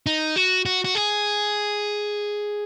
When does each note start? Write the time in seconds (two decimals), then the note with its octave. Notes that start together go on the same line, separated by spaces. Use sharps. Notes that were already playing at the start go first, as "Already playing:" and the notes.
0.06 D#4
0.36 F#4
0.66 F#4
0.84 F#4
0.95 G#4